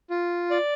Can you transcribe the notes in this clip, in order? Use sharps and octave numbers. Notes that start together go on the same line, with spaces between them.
F4
D5